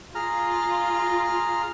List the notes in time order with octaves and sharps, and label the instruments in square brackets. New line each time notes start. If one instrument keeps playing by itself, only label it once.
[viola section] F4 [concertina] G#4 A#5 F6